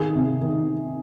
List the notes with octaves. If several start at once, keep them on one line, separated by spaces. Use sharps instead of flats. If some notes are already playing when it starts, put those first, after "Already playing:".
Already playing: D#3 G#4
C3
D#3